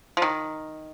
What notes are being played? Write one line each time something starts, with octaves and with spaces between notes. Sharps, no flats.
F3
D#3